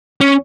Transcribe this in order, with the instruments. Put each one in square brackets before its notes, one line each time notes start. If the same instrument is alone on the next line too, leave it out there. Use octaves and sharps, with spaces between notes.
[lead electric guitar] C#4